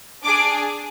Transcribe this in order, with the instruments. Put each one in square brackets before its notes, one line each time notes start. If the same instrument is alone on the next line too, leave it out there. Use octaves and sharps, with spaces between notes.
[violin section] D4 G#4 D6